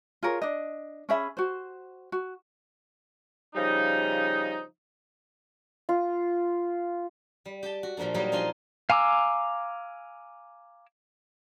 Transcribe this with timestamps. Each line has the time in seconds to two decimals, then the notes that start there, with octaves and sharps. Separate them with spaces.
0.23 F4 G#4 A#4 C#5
0.42 D4 D#5
1.09 C#4 G#4 E5 B5
1.37 F#4 C5
2.12 F#4
3.56 C#3 F3 G3 D#4
5.89 F4
7.45 G3
7.63 G4 G5 A5
7.83 F#4
7.97 A#2 F3 G3 A#3 D4
8.15 F#3 G3 A#3 D#4
8.32 F3 D4 D#4 F4 G#5 C6
8.90 F5 G#5 A#5 D6 E6